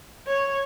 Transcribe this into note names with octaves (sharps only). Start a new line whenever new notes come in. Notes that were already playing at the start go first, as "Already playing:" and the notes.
C#5